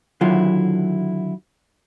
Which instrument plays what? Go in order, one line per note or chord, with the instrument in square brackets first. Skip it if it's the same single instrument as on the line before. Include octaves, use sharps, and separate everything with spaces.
[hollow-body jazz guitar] D3 D#3 F#3 E4 F4